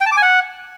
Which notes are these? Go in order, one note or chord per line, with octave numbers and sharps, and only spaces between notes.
G5
A5
D6
G#5
F#5